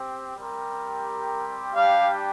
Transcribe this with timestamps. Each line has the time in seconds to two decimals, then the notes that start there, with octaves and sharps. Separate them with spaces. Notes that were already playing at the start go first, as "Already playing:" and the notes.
Already playing: C4 G4
0.37 G3 C4 G4 A#4
1.75 G3 D4 G4 F5